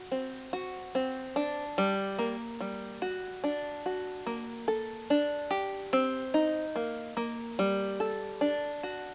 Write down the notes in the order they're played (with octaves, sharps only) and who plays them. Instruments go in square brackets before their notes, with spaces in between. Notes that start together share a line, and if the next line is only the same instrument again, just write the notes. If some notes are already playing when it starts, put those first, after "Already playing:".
Already playing: [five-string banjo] F#4
C4
F#4
C4
D4
G3
A#3
G3
F#4
D4
F#4
A#3
A4
D4
G4
C4
D#4
A#3
A#3
G3
A4
D4
F#4